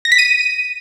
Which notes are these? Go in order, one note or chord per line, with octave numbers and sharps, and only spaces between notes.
A#6
B6
D#7